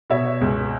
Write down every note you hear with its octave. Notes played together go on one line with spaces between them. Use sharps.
B2 C#5 E5
C#2